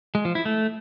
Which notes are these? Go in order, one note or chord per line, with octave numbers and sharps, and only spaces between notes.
G#3
F3
E4
A3